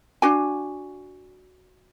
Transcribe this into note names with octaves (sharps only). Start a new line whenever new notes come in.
D4 F#4 G#5